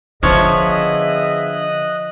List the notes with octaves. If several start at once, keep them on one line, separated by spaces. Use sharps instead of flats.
D3 F3 B3 G#4 C#5 D#5 E5 F#6